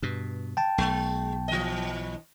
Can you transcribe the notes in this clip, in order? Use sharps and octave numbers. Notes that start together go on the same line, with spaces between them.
G2 B2
G5 A5
B1 G#3
E3 D#5